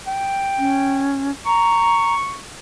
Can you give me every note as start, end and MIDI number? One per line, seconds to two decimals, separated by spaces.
0.07 1.10 79
0.58 1.31 61
1.46 2.15 82
1.46 2.39 85